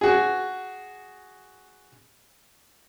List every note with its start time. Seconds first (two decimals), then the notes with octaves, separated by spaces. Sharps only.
0.01 F#4 G#4